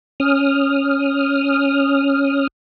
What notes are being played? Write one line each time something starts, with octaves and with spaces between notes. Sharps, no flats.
C#4 D#6 F6